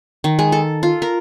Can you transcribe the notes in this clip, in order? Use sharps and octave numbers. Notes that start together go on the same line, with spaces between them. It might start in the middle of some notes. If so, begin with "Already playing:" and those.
D#3
G#3
A4
F4
A#4